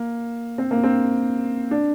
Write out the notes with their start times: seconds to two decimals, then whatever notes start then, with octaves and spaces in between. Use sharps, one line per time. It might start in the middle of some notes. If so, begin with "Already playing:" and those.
Already playing: A#3
0.58 C4
0.71 A#3
0.84 C4
1.71 D4